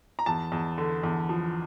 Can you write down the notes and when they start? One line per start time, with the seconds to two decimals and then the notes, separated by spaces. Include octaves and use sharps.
0.19 A#5
0.26 E2 A5
0.52 E2
0.78 D3
1.03 E2
1.29 F3